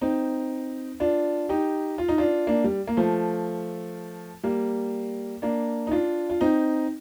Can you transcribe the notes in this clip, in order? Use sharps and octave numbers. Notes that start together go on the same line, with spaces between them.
C4 D#4
D4 F4
D#4 G4
F4
D#4
D4 F4
A#3 D4
G3
A#3
F3 A3
G3 A#3
A#3 D4
D#4
D4 F4
F4
C4 D#4